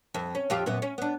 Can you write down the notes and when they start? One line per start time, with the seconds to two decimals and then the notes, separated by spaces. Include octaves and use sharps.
0.14 F2
0.35 C#4
0.50 F2 F4 G4
0.66 F#2 A#2 B3
0.82 C#4
0.98 B3 D4